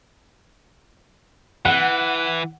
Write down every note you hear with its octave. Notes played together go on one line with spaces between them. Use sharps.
E3 F#5